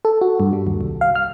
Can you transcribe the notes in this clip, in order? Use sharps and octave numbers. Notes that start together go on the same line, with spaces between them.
A4
F#4
G2
G3
D#2
C2
F5
F6